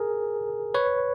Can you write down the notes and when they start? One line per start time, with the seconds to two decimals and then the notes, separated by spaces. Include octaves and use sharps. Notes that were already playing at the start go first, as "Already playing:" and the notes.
Already playing: G#4 A#4
0.74 B4 C#5